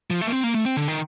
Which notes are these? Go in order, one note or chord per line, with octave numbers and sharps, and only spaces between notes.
F3
A3
A#3
C4
A#3
A3
C4
D3
D#3